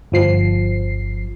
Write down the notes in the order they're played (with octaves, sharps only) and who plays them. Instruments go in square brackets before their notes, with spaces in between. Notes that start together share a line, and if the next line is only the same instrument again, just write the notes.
[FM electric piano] G1 F3 C7